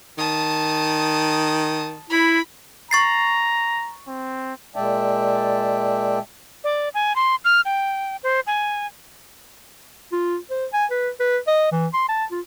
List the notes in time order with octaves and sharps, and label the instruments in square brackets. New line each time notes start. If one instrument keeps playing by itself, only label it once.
[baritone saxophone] D#3 [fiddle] A5 D#6
[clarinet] E4 [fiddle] B5
[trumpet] A#5 [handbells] C#6 A6 C7
[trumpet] C4
[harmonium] A#2 G#3 D5 E5 G5 A5
[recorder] D5
G#5
C6
F6
G5
C5
G#5
[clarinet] F4
C5
G#5
B4
B4
D#5
E3
C6
A5
F4